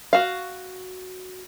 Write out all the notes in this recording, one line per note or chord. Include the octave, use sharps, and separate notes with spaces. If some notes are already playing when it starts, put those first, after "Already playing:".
F#4 F5